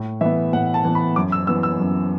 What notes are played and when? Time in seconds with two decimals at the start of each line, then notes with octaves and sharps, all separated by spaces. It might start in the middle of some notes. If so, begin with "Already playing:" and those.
Already playing: A2
0.21 E3 B3 E5
0.53 A2 F#5
0.74 A5
0.85 E3 B3
0.95 B5
1.16 F#2 D6
1.32 E6
1.47 E3 B3 E6
1.63 E6
1.80 F#2